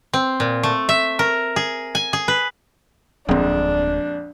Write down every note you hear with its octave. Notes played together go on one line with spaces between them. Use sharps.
C4
A#2
A3
E5
A#4
G#4
G#5
G#4
B4
D1 A#1 F2 G#3 C4 D4